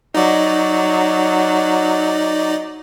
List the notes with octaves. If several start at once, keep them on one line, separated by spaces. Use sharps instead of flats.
F#3 D#4 D5